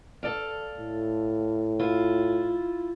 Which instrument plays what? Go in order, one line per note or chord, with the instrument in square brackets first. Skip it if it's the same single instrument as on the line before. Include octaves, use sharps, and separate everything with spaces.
[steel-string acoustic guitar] A4 D5 F5
[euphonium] A2
[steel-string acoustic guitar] E4 F4